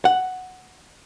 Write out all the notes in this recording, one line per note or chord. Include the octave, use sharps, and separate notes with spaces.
F#5